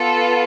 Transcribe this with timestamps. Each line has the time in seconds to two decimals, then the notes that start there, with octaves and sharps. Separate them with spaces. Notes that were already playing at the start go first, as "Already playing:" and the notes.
Already playing: B3 F4 A4